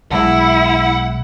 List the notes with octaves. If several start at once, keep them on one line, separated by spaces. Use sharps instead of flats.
B1 B2 G#3 E4 F#5